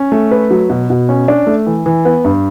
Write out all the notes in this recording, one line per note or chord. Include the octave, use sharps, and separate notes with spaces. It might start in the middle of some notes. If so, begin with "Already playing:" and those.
Already playing: C#4
A3
B4
F#3
B2
B2
C#4
D4
A3
E3
E3
B3
G2